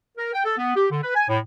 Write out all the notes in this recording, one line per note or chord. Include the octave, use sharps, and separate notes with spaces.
A#4
G5
A4
B3
G4
D3
B4
G#5
A2